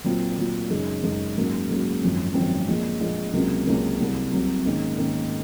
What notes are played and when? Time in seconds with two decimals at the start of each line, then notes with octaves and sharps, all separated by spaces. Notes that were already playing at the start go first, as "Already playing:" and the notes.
0.04 A#2 F#3 C4 F4
0.38 A#2 F#3 C4 F4
0.70 F#2 C#3 G#3 D#4 G#4
1.03 F#2 C#3 G#3 D#4 G#4
1.36 G#2 F#3 A#3 C#4 F#4
1.69 G#2 F#3 A#3 C#4 F#4
2.02 G#1 F#2 F3 C4
2.34 G#1 F#2 F3 C4
2.68 A#1 A#2 G#3
3.00 A#1 A#2 G#3
3.33 C#2 C3 F#3 A#3 C#4
3.66 C#2 C3 F#3 A#3 C#4
3.99 C2 C3 F#3
4.33 C2 C3 F#3
4.65 G#2 D#3 A#3 C#4
4.98 G#2 D#3 A#3 C#4